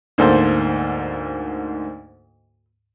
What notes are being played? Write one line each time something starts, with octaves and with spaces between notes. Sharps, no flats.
D2 G#2 A#3 A4 C5